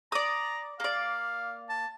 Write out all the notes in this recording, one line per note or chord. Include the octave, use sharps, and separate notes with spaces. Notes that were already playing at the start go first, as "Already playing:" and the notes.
D5 A#5 D#6
A#3 D5 F5
A5